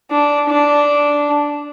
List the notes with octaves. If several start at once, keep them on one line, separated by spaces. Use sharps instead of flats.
D4
D4